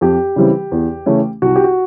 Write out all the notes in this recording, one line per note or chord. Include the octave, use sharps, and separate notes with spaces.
F2 G4
C#3 E3 G3 C4
E2
C#3 E3 A3 C#4
C2 F#4
G4
F#4